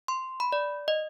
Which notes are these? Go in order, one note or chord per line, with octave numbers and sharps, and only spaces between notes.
C6
B5
D5
D#5